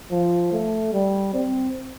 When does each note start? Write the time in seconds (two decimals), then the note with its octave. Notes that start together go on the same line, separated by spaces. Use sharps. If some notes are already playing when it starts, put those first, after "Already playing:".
0.11 F3
0.52 A3
0.93 G3
1.34 C4